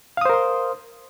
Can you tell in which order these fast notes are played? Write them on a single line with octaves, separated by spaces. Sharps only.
F5 D#6 C5 A#4 C6